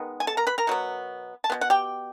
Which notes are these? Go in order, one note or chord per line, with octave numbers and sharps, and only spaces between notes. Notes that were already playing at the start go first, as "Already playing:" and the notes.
Already playing: D#3 G#3 B3
G#5
A4 A5
A#4 A#5
B4 B5
A#4 A#5
B2 F#3 B3
A5
B2 G#3 B3
F#5
G4 G5